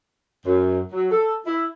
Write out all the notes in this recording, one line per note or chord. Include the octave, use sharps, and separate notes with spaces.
F#2
F#3
A4
E4